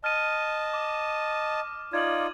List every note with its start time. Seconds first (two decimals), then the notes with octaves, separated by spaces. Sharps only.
0.04 D#5 A5 F6 D#7
0.74 D6
1.93 D#4 F4 D5 G#6 F#7